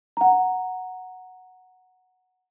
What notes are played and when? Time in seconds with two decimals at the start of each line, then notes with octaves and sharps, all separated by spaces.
0.17 F#5 A#5